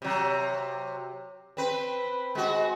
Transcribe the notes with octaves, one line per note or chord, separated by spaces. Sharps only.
C3 F#3
C4 B4
G#3 F#4